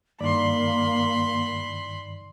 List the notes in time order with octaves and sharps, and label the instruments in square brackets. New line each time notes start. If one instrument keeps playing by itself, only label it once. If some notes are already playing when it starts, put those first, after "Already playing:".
[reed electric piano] G2 D#3 D5 [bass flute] A#3 [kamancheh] B5 C6